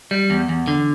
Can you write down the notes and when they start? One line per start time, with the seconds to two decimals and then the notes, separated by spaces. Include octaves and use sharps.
0.11 G3
0.30 E2
0.49 E2
0.68 D3